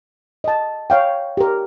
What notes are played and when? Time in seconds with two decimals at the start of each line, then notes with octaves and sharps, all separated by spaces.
0.44 D#5 A5
0.90 C#5 F5 G5
1.37 G4 A#4